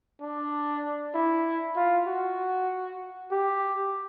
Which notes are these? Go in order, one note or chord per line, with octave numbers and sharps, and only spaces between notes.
D4
E4
F4
F#4
G4